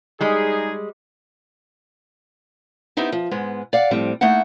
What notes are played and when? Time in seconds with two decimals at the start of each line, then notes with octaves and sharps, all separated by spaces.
0.21 G3 G#3 D#4 G#4
2.97 B3 C4 D#4 E4 G4
3.12 F3
3.31 G#2 G#3 B3
3.73 D5 F5 F#5
3.91 A2 F3 G3 C4
4.21 A3 A#3 D#4 E4 F#5